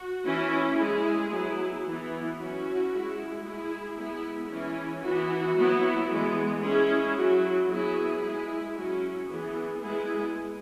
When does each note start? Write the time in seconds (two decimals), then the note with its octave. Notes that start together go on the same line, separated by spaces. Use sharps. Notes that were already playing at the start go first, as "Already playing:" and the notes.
Already playing: F#4
0.24 E3 C#4 E4
0.77 G#3 E4 G#4
1.30 F#3 B3 E4
1.84 E3 B3 E4
2.37 F#3 C#4 E4 F#4
2.90 G#3 E4
3.43 G#3 E4 G#4
3.96 G#3 B3 E4
4.50 E3 C#4 E4
5.03 E3 B3 E4 F#4
5.55 F#3 B3 E4
6.08 E3 G#3 B3
6.62 G#3 C#4 E4 G#4
7.15 F#3 E4 F#4
7.68 F#3 B3 E4 G#4
8.22 G#3 E4
8.75 F#3 C#4 E4 F#4
9.28 E3 B3 E4 G#4
9.81 G#3 B3 E4 G#4